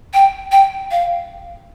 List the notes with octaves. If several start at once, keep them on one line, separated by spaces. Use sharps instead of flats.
G5
G5
F5